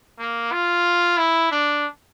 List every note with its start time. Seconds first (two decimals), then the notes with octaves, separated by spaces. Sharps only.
0.19 A#3
0.52 F4
1.17 E4
1.51 D4